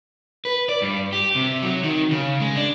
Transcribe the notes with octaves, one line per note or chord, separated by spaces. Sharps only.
B4
D5
G2
G4
C3
F#3
D#3
C#3
G#3
D4